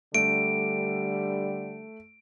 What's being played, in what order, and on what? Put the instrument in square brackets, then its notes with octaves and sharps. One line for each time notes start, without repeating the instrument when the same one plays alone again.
[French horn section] D3 G3 [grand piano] A3 [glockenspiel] D7